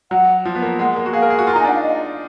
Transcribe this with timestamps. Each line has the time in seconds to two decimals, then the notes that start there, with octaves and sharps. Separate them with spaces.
0.11 F#3 F#5
0.45 F3
0.55 B3
0.62 A#3
0.79 G#3 F#5
0.96 A#3
1.06 F#4
1.13 G#4 F5
1.22 A#4
1.30 G#4
1.39 F#4
1.47 F4
1.53 A#5
1.56 D#4
1.60 G#5
1.64 D4
1.68 F#5
1.74 F5
1.82 D#5